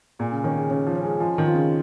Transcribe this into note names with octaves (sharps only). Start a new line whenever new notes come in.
A#2 G#4
C#3
D#3 C#4
C#3
C#3 C#4
F3
C#4
G#3
F3 G#3
D#3
F4
C#3